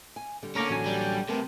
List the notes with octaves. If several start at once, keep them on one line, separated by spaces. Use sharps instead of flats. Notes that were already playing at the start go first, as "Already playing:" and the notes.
G#5
D3 G3
D3 A#3 C#4 D4 A#4 A#5 D6
A1 F#3 G#5
G3
C3 A3 B3 A#4